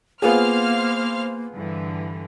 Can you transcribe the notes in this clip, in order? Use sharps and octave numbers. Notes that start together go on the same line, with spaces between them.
A#3 B3 F4 G#4 C5 F5 F6
G2 D3 E3